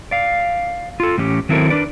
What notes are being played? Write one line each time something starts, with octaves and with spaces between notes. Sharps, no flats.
D5 F5
F4 A4
A2 E3 C#4 G4
D#3 F#3 C4 E4 A4 A#4
D4 A#4 B4 D5